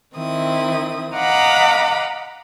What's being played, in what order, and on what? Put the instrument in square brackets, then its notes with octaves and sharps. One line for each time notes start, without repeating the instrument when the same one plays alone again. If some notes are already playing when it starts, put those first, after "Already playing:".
[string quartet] D#3 C4 E4 D#6
D#5 F5 F#5 A#5 B5 D6